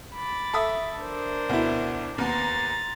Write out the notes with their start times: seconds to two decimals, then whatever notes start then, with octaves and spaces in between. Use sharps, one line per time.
0.15 B5 D6 A6
0.53 A4 E5 D#6
0.99 D4 A#4 C5
1.49 D2 B2 E4
2.18 D#2 B3 A#5 C6 A6